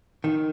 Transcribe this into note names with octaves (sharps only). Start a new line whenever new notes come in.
D#3